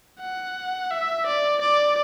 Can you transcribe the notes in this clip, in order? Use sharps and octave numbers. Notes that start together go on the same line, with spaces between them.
F#5
E5
D5
D5